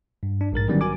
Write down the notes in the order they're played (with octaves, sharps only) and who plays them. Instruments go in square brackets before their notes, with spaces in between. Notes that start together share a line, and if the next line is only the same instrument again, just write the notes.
[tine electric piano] G2
D4
A#1 G#2 A#4 A6
D3 D#3 F#3 G3 B3 C#4
F#4 A#4 G#5 D6